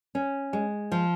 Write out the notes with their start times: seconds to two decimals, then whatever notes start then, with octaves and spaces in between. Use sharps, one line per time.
0.15 C#4
0.53 G#3
0.92 F3